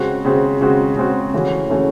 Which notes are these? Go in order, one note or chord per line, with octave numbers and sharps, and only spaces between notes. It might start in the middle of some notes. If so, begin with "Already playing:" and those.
Already playing: C#3 G#3 C4 F#4
C#3 G#3 C4 F#4
C#3 G#3 C4 F#4
C#3 G#3 C4 F#4
C#3 E3 A3 C#4 F#4
C#3 E3 A3 C#4 F#4